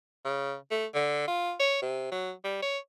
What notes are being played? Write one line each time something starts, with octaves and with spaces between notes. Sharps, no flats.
C#3
A3
D3
F4
C#5
C3
F#3
G3
C#5